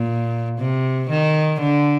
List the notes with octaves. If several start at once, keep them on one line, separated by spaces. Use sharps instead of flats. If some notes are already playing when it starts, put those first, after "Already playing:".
Already playing: A#2
C3
D#3
D3